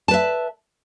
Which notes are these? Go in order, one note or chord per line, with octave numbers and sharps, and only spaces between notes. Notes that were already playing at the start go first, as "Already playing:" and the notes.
B4 E5 A5